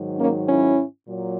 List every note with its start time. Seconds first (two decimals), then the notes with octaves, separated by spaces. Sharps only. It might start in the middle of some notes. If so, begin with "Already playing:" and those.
Already playing: G#2 D#3 F#3
0.19 A#3 C#4
0.48 C#4 E4
1.07 A#2 F#3